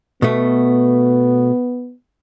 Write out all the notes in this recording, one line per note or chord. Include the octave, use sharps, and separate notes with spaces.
B2 A3 B3